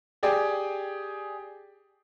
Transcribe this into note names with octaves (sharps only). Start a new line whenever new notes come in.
G4 G#4 D5 G5 G#5